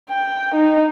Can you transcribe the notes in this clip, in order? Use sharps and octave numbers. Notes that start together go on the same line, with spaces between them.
G5
D#4